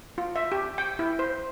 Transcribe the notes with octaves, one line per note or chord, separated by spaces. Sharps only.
F4
E5
G4
G5
E4
C5